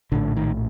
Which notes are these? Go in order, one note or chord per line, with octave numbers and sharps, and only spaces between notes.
A#1 A2 D3
D#3